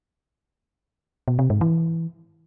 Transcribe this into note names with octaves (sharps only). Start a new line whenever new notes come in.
B2
C3
G#2
E3